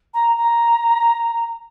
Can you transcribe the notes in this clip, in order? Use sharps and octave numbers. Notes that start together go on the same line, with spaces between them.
A#5
A#5